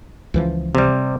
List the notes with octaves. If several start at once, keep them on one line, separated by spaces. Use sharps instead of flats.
C#2 E3 F3
C3 G3